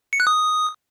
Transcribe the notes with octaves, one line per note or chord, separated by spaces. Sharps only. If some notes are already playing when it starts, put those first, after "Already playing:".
C#7
F#6
D#6